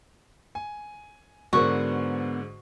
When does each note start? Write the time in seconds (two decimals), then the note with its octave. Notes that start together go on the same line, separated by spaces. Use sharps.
0.55 G#5
1.53 G#2 D3 G#3 B3 F#4 A#4 C5